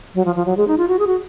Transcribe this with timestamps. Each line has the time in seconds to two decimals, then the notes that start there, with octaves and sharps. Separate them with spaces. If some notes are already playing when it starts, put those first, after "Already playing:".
0.15 F#3
0.25 F3
0.36 F3
0.46 F#3
0.57 G#3
0.68 D#4
0.78 F4
0.88 F#4
0.99 G#4
1.07 F#4